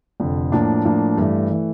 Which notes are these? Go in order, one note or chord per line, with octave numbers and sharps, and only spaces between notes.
F1 F2 D3
A2 F3 A#3 D4
A2 F3 A#3 D4
G2 E3 A3
E3 A3